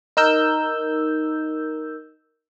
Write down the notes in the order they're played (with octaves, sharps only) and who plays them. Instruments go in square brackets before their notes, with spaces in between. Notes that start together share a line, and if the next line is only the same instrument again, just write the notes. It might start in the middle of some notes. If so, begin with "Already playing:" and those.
[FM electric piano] D#4 A#4 E6 G6